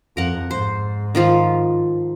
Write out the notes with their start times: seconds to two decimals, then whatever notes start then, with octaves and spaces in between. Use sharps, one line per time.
0.17 F2 A#4 F#5
0.51 G#2 C5
1.15 D#3 F3 F4